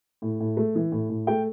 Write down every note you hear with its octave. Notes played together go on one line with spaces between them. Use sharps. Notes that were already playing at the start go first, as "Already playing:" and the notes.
A2
A2
A3
E3
A2
A2
A3 G5